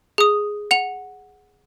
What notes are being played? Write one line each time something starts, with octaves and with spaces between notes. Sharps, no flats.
G#4 D#6
F#5 F7